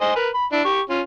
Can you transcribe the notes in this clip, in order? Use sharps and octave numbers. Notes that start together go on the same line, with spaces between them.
C5 D#5 G#5
A#4 B4
B5
D4 E4 D5
G4 C#6
C#4 F4